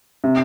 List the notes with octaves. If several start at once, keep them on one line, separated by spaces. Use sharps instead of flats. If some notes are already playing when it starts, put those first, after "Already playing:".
C3